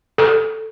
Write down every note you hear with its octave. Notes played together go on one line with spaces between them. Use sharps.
A4